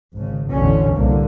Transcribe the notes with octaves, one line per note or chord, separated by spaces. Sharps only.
G#1 C#3
A1 E2 B2 D3 C#4
C2 A2 D3 A#3